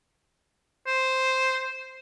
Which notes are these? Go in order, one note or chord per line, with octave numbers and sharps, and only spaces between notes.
C5